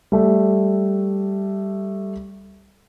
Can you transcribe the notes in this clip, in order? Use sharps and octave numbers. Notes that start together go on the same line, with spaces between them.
G3 A3